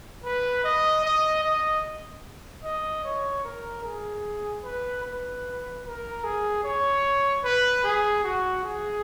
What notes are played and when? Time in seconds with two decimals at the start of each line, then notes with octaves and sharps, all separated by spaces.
0.24 B4
0.64 D#5
1.05 D#5
1.44 D#5
2.64 D#5
3.04 C#5
3.44 A#4
3.84 G#4
4.64 B4
5.04 B4
5.85 A#4
6.24 G#4
6.64 C#5
7.44 B4
7.84 G#4
8.24 F#4
8.64 G#4